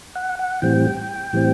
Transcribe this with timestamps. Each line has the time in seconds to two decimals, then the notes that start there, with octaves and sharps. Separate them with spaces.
0.16 F#5
0.39 F#5
0.62 A2 E3 G3 C4 G5
1.33 A2 E3 G3 C4